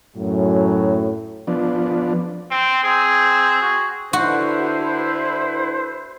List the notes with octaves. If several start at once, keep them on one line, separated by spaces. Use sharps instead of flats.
F#2 A2 F#3
F3 B3 D4
C4
C4 G#4
F#4
D3 E4 F#4 B4 C5